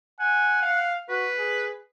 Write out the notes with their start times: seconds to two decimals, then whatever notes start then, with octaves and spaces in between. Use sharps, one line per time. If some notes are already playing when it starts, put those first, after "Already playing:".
0.20 F#5 G#5
0.62 F5
1.09 F#4 B4
1.39 G#4